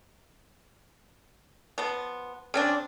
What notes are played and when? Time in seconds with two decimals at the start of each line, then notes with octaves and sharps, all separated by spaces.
1.78 F3 B3
2.54 C#3 C4 D4